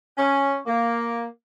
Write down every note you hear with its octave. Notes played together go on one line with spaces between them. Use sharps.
C#4
A#3